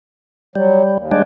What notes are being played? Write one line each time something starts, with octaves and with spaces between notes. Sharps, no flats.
F#3 G3
D#2
G3 G#3 D4